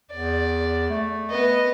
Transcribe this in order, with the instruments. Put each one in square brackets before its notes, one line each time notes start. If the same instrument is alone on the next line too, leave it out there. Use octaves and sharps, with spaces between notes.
[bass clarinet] E2 [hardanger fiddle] D5
[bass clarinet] A3
[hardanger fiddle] B3 D#5